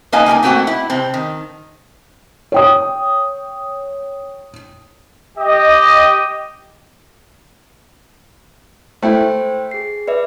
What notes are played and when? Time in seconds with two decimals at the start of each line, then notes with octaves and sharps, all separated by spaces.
0.12 A#3 D#4 B4 D#5 F5 G#5
0.26 A#3 D#4 G5 G#5
0.43 A3 A#3 C4 F#4 F#5 G5
0.67 E4
0.90 C3 C4
1.14 D#3
2.52 C#5 G5 D#6
5.38 G4 D#5
9.02 A3 E4 C5 G5
9.71 G#4 C7
10.08 B4 D5 E5